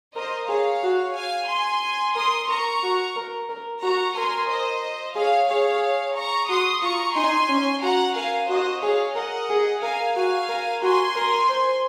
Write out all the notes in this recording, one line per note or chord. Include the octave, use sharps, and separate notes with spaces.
A#4 C5 D#5
G#4 C#5 F5
F#4
F5 G#5
G#5 C6
A#4 C6 D#6
A#4 A#5 C#6
F#4
A#4
A#4
F#4 A#5 C#6
A#4 G#5 C6
C5 D#5
G#4 C#5 F5
G#4 C#5 F5
A#5 C#6
F#4 C6 D#6
F4 A#5 C#6
D#4 G#5 C6
C#4
F#4 F#5 A#5
A#4 F5 G#5
F#4 C5 D#5
G#4 C#5 F5
A#4 D#5 F#5
G#4
A#4 F5 G#5
F#4 F5 G#5
A#4
F#4 G#5 C6
A#4
C5